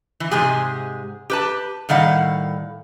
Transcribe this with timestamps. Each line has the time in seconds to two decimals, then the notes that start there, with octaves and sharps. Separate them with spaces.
0.20 E3
0.31 G#2 C3 G#3 G4 G#4
1.30 G4 B4 A5
1.89 A2 D#3 G3 F5 F#5